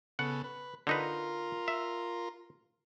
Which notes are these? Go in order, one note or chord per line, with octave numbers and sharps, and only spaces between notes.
C#3 B3 A4 F#5
B4
D3 D#4 F4 A#4 B4
E5